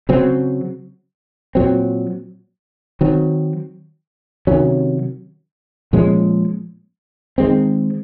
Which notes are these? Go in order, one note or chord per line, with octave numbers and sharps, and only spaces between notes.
C#3 F#3 C4
A#2 F#3 C4
D#3 F#3 C4
C3 D#3 F#3 C#4
A#2 F3 G#3 C#4
D#3 G#3 C4